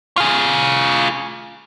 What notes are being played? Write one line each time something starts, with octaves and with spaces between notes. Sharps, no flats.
F4 G#4